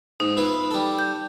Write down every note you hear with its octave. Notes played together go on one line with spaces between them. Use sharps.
G#2 D#4
B3 E4 F4
G3 A4
G6